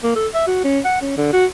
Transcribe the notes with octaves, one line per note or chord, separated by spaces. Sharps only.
A#3
A4
E5
F#4
C#4
F#5
C#4
D3
F#4